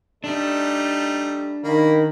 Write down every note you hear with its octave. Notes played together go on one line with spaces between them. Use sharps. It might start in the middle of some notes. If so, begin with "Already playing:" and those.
G3 A3 D4 D#4
D#3 A#3 B5